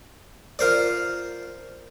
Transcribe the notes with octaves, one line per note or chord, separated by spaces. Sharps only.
F4 A#4 C5 D5